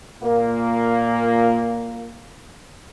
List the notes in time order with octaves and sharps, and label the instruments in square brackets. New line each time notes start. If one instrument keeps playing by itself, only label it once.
[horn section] A#2 A#3